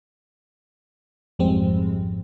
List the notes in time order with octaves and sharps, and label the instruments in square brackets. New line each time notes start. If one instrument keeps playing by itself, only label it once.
[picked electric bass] G#1 F2 F3 [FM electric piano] G3 G#3 C4